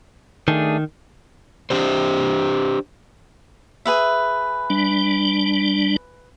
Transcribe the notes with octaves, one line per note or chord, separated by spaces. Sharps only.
D#3 A3 D4 G#4
D4 G4 C5
G#4 B4 E5
G3 D4